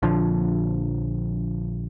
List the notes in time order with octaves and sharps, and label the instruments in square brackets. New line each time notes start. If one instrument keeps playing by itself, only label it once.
[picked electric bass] A#1 D3 F3